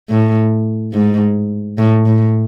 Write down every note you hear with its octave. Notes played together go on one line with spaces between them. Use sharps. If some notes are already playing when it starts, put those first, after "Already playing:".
A2
G#2
A2
A2